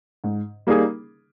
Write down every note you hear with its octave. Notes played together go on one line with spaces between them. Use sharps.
G#2
G3 A#3 D#4 G#4